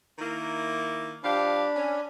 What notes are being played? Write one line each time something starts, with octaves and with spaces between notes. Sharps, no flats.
D#3 A#3 E4
F3 D4 G4 F5 B5
C#4